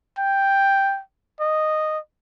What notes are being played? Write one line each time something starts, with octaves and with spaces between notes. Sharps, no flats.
G5
D#5